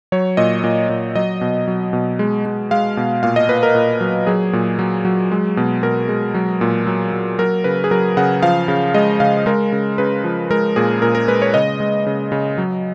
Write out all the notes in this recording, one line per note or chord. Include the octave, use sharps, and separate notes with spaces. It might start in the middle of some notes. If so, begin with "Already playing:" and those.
F#3 C#5
A#2 D#5
A#2
A#2
F#3 D#5
B2
F#3
B2
G#3
G#3
G#3 F5
B2
A#2 F5
D#5
A#2 B4
A#4
A#2
F#3
F#3 G#4
A#2
F#3
F#3
G#3
B2
B2 A#4
G#3
F#3
A#2
F#3
F#3
F#3 A#4
C#3 B4
G#4
F#3 A#4
C#3 F#5
F3 F5
C#3
G#3 D#5
C#3 F5
G#3 A#4
C#3
C#3 B4
F3
G#3 A#4
A#2 G#4
A#2 A#4
A#4
G#3 B4
C#5
C#3 D#5
G#3
C#3
C#3
F#3